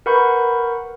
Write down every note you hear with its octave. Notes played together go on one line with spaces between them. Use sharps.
A#4 B4 F#5 B5 C#6 G6